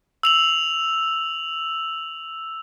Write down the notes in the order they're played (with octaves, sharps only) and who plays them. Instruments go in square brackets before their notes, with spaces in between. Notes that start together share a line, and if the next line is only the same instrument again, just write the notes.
[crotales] E6 F7 F#7